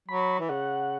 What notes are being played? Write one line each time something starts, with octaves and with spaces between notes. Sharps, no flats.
F#3 B5
E3
C#3 F#5